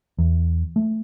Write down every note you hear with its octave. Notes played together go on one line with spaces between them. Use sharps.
E2
A3